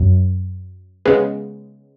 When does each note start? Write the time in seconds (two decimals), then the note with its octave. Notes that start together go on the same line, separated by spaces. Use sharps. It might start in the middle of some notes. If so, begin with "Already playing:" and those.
Already playing: F#2
1.05 C#3 G#3 B3